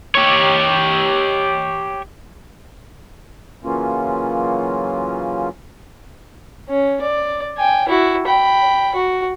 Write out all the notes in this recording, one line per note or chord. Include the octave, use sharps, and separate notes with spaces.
G4 C#5
C#3 E3 F#3 A#3 C#4 F4
C#4
D5
G5 G#5
E4 F#4
G5 B5
F#4